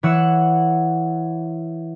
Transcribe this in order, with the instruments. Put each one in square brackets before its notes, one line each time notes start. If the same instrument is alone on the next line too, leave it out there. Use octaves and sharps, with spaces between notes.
[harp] E3 C#5 F#5 E6 F#6 C#7